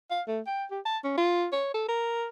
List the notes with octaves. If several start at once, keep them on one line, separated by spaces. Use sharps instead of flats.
F5
A3
G5
G4
A5
C#4
F4
C#5
A4
A#4